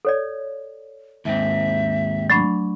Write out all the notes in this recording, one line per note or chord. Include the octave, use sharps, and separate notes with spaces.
A4 C#5 D5
D#2 G#2 C4 E5
F#3 A3 D4 D5 B5 C#6